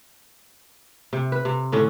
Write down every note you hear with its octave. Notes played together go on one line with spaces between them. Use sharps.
C3
B4
C3
A2 D3 C#4